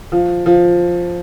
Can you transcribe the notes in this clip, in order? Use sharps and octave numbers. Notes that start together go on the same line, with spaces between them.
F3
F3